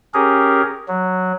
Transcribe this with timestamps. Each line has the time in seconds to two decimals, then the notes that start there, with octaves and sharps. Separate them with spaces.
0.14 C#4 G4 G#4 A#4
0.88 F#3